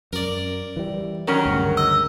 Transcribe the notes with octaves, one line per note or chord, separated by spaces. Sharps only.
F#2 A#4 D5
E3 G3
D#3 F#3 C#4 A#4
D2 G2 C#3
D#5 E6